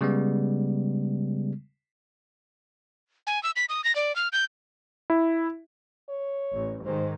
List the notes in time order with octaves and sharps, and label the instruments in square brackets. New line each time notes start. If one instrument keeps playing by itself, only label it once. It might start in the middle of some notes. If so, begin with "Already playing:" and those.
[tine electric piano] C#3 G3 G#3 B3
[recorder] G#5
E6
B6
D#6
A#6
D5
F6
G6
[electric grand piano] E4
[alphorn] C#5
[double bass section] A1
[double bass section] G#2 D#3 [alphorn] C5